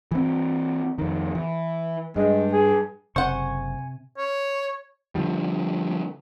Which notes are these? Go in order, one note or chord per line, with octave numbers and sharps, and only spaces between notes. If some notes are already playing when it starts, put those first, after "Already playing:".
E3 C4
F2 D#3
E3
G2 G#3
G#4
F#1 C3 C5 F#5 G#5 C#6
C#5
D3 D#3 F3 G3